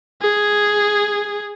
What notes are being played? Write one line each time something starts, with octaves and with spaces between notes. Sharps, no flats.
G#4